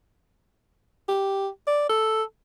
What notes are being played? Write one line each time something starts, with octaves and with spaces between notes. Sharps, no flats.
G4
D5
A4